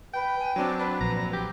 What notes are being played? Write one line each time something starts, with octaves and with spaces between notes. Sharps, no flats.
B4 G5
G#5
F#3 C4 D4
D4 B4
A#1 A#5
G4